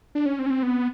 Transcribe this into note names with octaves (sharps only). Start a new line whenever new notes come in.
D4
C#4
C4
C#4
C4
B3